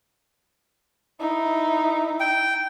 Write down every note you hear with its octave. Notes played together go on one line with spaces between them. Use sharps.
D#4 E4
G5